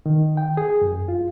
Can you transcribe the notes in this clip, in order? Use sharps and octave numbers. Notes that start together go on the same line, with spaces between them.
D#3
G5
G#4
F#2
F4